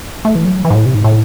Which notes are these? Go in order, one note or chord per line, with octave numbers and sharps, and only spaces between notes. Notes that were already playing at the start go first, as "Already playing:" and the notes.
A3
E3
F#3
E3
G#2
A2
C3
G#2
A2